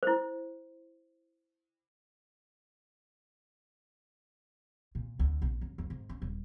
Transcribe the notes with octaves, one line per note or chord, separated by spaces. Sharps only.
E4 C5
A#2
D2
A#1
F#2
F2
G#2
C#4
D#1